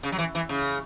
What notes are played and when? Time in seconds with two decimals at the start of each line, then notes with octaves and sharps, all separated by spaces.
0.03 C#3
0.12 F#3
0.19 E3
0.35 E3
0.49 C#3